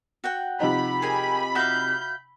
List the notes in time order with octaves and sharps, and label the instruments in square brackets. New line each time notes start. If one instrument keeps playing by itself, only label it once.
[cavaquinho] F#4 F#5 G5
[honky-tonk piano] C3 F3 D#4 [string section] B5
[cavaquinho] G#4 A#4 G5 [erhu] G#5
[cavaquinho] F#4 E5 F5 [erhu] G6